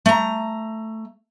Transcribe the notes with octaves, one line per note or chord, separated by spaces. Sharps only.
A3 A#5